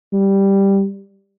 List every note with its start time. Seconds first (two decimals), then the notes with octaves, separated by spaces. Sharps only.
0.13 G3